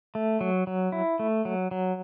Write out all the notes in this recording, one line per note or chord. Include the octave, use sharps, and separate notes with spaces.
A3
F#3
F#3
E4
A3
F#3
F#3